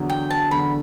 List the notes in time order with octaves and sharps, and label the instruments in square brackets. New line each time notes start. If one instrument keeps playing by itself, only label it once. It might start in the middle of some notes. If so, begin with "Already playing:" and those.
Already playing: [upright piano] E2 D3 F#3
[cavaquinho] G5
A5
[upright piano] E2 D3 F#3 [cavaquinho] B5